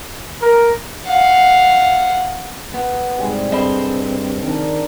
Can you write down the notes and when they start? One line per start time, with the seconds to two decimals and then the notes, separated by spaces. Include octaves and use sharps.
0.42 A#4
1.05 F5 F#5
2.74 B3
3.18 G#2 C3 G3 G#3
3.52 G2 C4 A4 D#5 B5
4.43 D#3 D4 A#4